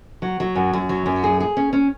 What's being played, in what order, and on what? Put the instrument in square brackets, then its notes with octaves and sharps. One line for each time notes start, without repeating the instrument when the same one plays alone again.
[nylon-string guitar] F#3
F#3
F#2
F#2
F#3
F#2
G#4
G#4
C#4
C#4